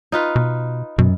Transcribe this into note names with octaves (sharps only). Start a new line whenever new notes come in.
D#4 F4 B4
B2
F#2 B2